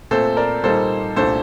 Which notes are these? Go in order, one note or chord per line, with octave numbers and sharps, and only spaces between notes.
A#2 A3 C4 A4 C5
A#4 D5
A#2 G3 A#3 D#4 A4 C5
C2 A#2 A3 D4 A4 C5